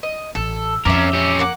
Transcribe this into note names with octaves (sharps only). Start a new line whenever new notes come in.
D#5
A1 A4
F2 F3 C#4 A#4 E5 D6
C#4 G4
A#3 F#5 D6